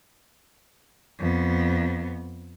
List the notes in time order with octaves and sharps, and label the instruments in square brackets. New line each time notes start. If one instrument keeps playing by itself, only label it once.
[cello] F2 B3